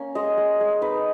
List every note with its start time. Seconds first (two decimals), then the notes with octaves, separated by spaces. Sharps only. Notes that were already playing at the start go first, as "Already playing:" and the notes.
Already playing: A#3 C#4
0.15 G#3 D#5
0.37 G#3
0.60 G#3
0.82 D#4 B4